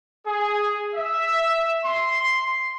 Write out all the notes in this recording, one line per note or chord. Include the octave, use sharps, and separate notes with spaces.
G#4
E5
C6